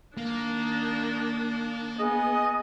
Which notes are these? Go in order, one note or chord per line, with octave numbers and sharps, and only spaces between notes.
D#3 A#3 D4
B3 G#4 D#5